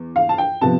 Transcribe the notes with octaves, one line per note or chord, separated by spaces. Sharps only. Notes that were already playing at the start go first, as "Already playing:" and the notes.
Already playing: E2
F5
A5
G5
C3 F3 B3 A5